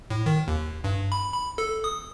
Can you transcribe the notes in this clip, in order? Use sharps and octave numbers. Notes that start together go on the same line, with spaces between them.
A2
D#3
D#2
G2
B5
B5
A4
D#6